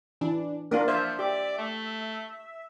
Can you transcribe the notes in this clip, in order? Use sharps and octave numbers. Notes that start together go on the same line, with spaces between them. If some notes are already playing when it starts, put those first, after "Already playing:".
E3 D4
A#3 D4 F4 A#4
F3 C5 E5
G4 D5
A3